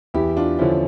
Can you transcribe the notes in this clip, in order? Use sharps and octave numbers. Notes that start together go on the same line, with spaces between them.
E2 E4 G4
D4 F4
D3 F3 C#4 E4